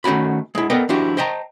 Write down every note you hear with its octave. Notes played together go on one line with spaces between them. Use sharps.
D#3 A3 C#4 F#4 B5
G#3 E4
B3 A4 A#4 D5 D#5 G5
F3 D4 E4 F#4 G4
C5 D#5 G5 A5 A#5